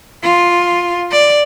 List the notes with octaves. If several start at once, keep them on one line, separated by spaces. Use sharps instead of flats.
F4
D5